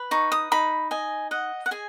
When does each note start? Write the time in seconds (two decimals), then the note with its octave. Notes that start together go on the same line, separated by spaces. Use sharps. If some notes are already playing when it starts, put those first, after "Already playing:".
Already playing: B4
0.11 D#4 C#6
0.32 D#6
0.52 D#4 B5
0.91 D#5 G#5
1.31 D#5 F#5
1.66 F#5
1.71 G#4 G#5